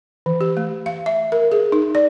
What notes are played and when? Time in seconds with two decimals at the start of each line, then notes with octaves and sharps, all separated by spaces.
0.26 E3
0.41 G4
0.57 A3
0.86 F5
1.06 E5
1.32 A#4
1.52 G#4
1.72 D#4
1.95 D5